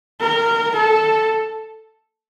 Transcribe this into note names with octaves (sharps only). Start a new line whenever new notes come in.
A#4
A4